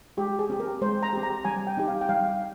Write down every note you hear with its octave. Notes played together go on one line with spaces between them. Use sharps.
G#3 G4
G#4
C4 G4
A#4
G#3 C5
A#5
C4 G4
A#5
G3 G#5
G5
C4 D#4 G4
F5
G5
G3 F5